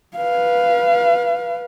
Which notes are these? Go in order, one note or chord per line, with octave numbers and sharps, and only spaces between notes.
B4 F5